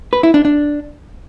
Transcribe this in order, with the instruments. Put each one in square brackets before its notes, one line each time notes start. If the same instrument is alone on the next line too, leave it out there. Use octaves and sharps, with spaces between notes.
[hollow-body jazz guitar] B4
E4
D4
D4